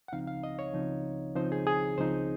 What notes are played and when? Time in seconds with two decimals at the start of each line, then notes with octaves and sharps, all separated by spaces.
0.08 F#5
0.12 C#2 C#3 F3 C4 D#4 F5
0.27 F5
0.44 D#5
0.59 C#5
0.74 C#2 C#3 F3 C4 D#4
1.35 C#2 C#3 F3 C4 D#4 C5
1.52 G#4
1.67 G#4
1.98 C#2 C#3 F3 C4 D#4 C5